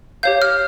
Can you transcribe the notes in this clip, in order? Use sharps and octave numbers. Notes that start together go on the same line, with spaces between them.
G4 C#5 F5 G6
F6